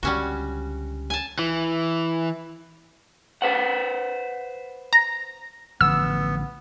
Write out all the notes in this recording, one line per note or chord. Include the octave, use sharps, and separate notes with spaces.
C#2 D3 G3 C#4 F#4
G#5 A5
E3
B4 C5 F#5
A#5
A1 D3 F3 B3 E6